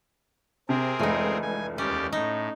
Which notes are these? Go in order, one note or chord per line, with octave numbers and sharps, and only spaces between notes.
C3 C4 G#4 A#4
F1 C#2 E3 D#4
G#5
D#2 C#4 G4 D5
A2 D#4